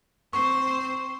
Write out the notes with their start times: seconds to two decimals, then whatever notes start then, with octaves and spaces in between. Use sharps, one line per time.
0.33 C4 C5 C#6